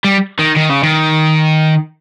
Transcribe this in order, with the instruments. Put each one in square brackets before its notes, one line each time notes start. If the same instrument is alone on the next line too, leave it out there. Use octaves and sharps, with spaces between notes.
[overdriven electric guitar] G3
D#3
D#3
C#3
D#3